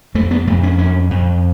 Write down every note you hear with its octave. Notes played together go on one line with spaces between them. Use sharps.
F2 A3
B3
F2 A3
C#4
F2 C#4
F2